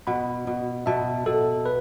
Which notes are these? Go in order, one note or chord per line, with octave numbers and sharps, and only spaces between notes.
B2 F#5 B5
B2
B2 E5 A5
B2 A4
B4